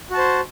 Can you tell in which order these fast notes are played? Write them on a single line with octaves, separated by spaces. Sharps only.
F#4 A5 C5